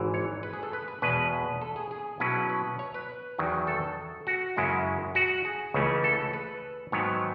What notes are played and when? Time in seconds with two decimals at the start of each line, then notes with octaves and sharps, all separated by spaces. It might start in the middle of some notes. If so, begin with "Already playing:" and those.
Already playing: G#1 G#2 E3
0.14 C#5
0.43 B4
0.53 G#4
0.63 A4
0.73 B4
0.88 B4
1.02 E2 B2 G#3 B4
1.61 A4
1.76 G#4
1.91 G#4
2.20 B2 F#3 C#4 E4 B4
2.49 B4
2.79 C#5
2.94 B4
3.38 E2 D#3 F#3
3.67 A4
4.27 F#4
4.56 F#2 C#3 G#3 C#4 E4
5.15 F#4
5.45 G#4
5.74 C#2 C#3 E3 A3 C#4
6.04 A4
6.33 B4
6.92 G#2 D#3 F#3 B3 C#5